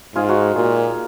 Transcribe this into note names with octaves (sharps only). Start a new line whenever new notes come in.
G#2 F4 G#4
D#4 F#4
A#2 F4 G#4